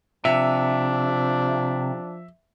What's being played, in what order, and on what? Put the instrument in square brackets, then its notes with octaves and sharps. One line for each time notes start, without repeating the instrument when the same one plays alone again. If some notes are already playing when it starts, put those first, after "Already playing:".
[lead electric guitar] C3 [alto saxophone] F3 [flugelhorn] D4 [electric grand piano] E5